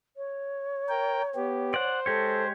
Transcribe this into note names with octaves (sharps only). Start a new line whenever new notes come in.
C#5
A#4 G5
B3 G4
C5 D5 F#5
G#3 G4 A4 C#5